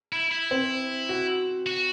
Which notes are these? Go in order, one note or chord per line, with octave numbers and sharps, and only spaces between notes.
E4
E4
C4
F#4
F#4